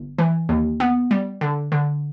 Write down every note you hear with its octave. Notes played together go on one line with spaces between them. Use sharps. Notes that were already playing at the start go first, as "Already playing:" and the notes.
Already playing: G1
E3
D#2
B3
G3
D3
D3